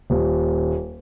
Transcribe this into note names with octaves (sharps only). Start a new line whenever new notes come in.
D#1